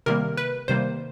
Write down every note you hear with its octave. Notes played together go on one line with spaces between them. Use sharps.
C3 D#3 G3 A#3 A#4
B4
C3 D#3 G3 A#3 C5